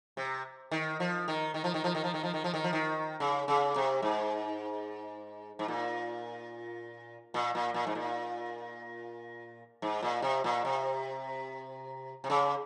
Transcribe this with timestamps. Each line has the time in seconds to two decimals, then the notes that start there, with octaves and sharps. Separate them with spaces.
0.17 C3
0.71 D#3
1.00 F3
1.28 D#3
1.54 D#3
1.64 F3
1.74 D#3
1.84 F3
1.95 D#3
2.04 F3
2.14 D#3
2.23 F3
2.34 D#3
2.44 F3
2.54 D#3
2.64 F3
2.73 D#3
3.20 C#3
3.48 C#3
3.76 C3
4.02 G#2
5.59 G#2
5.68 A#2
7.34 A#2
7.55 A#2
7.74 A#2
7.87 G#2
7.95 A#2
9.82 G#2
10.03 A#2
10.22 C3
10.44 A#2
10.65 C3
12.24 C3
12.30 C#3